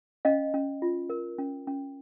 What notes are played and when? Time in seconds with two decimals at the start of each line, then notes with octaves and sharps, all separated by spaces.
0.25 C#4 D#5 F5
0.54 C#4
0.82 F4
1.10 A#4
1.38 C#4
1.67 C#4